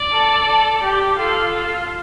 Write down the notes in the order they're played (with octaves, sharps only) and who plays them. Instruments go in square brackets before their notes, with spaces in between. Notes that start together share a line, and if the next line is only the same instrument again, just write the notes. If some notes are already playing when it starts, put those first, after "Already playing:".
Already playing: [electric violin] D5
[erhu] A4
A4
G4
[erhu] F4 [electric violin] A4
[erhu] F4